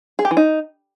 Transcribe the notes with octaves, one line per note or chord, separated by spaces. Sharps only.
G#4
G4
E3
D#4